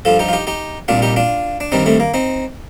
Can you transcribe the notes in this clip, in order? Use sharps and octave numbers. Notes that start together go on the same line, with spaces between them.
G2 F3 F4 A4
D#4 G4
F4
D#4 G4
D#4 G4
C2 A#2 G3 D4 F4
D#4 G4
D4 F4
D4
G2 D#3 G3 C4 D#4
A3 C4
A#3
C4 D#4